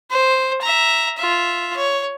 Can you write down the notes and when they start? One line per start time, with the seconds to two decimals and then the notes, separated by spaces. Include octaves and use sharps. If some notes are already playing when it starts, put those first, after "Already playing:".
0.11 C5
0.62 E5 A#5
1.17 F4 E5
1.76 C#5